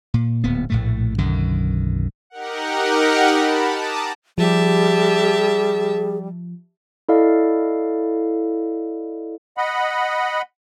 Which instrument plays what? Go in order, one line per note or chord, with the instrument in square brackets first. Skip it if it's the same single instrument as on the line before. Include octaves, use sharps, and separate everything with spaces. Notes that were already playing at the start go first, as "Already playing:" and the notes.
[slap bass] A#2
D1 A#2 B3
A#1 A2 A3
B1 F#2 D3 D#3
[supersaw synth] D#4 G4 A#4 F#5
A5 B5
A5 A#5 D6 D#6
[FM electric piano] F3 [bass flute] G3 [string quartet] G4 E5 A5 [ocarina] G#4
[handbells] E4 A4 D5 D#5 F5
[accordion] D#5 F#5 B5